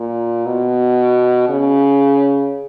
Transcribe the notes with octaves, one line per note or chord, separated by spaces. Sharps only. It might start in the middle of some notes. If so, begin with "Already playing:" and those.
Already playing: A#2
B2
C#3